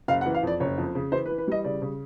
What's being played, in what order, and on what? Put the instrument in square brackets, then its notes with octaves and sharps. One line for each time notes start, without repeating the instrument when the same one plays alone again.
[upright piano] F#1 F5
F#5
E3
F5
F2 D5
F#1 C#5
F2
C#3
E3 C5
B4
E3
B4
G3 D#5
C#3 D5
C#3